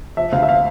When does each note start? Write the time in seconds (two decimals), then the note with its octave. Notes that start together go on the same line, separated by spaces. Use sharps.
0.17 F3 E5
0.32 D2 F5
0.43 E5
0.49 F5